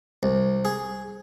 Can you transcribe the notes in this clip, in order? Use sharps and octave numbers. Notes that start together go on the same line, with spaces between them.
C2
G#4